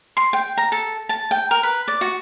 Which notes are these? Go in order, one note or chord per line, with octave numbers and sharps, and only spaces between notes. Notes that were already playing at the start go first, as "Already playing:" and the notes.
C6
G5
A#5
A4
A5
G5
A#4
B4
D5
F#4